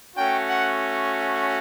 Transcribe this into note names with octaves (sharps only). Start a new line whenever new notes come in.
A3 C#4 F#4 G5
F#5